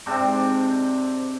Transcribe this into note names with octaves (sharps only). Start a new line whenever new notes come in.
G#2 C3 C4 D4